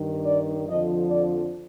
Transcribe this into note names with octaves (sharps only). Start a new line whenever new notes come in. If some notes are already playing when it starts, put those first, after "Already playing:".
Already playing: G2 D#3
D5
F2 D3 F3 D#5
D5